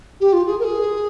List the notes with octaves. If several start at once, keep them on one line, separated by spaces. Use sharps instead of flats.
G4
F4
G#4
A#4
G#4